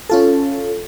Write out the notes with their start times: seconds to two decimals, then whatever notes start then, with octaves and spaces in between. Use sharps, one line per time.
0.10 C#4 F4 A4